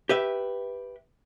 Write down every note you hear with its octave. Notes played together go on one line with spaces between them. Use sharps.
G4 B4 E5